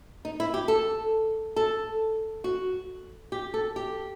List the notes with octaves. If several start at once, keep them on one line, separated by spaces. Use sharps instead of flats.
D#4
E4
G4
A4
A4
F#4
G4
A4
G4